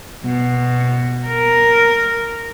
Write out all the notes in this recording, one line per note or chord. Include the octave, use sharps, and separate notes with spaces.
B2
A#4